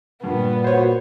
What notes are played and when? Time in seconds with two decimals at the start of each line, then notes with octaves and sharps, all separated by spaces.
0.24 G2 A#2 B3
0.64 F#4 C5 C#5